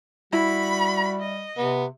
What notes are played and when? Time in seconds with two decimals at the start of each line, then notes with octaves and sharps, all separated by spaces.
0.33 G3 E4 F#4 B5
1.21 D#5
1.58 C3 B3